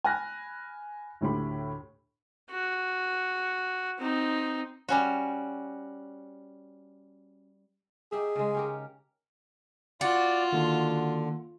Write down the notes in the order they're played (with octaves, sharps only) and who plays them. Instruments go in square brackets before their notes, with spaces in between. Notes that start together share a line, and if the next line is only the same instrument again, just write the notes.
[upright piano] G#5 B5 F6 F#6 A#6
D2 A2 G4 B5
[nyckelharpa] F#4
C4 D#4
[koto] G3 C#4 F#4
[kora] D#4 G4 E5 [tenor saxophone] G#4
[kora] C#3 G#3
C#4 G4 A#4
[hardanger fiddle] F4 [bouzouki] F#4 [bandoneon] D5
[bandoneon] D3 [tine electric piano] D#3 A#3